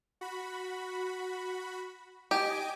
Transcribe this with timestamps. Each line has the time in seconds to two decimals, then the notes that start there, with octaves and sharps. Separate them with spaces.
0.21 F#4 B5
2.31 G4 D#5 G#5 D6